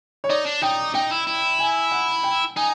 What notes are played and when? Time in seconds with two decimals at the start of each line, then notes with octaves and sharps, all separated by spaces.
0.24 C#5
0.29 D#4 D5
0.46 D4
0.62 D#4 G5
0.94 D#4 G5
1.11 E4
1.27 E4
1.59 G#5
1.91 F#5
2.23 G5
2.56 D#4 G#5